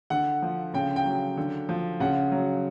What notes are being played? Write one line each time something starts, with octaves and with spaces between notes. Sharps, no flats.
D3 F#5
F3
C#3 G5
G5
F#3
D3
F3
C#3 F#5
F#3